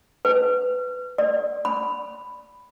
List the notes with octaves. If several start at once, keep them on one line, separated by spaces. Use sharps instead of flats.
B4
D5
B5